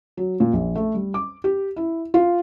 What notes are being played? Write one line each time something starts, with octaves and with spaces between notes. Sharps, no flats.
F#3
A#2
A#1
A3
G3
D6
G4
E4
F4